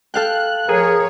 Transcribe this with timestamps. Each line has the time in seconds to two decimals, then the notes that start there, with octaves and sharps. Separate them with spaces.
0.14 A4 F5 G5 F#6
0.69 F3 G#4 A#4 C#5